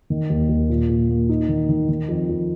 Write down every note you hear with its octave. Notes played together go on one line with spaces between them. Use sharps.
D#3
D#2
D#2
A#2
A#2
A#3
D#4
D#3
D#3
D#3
F2
F2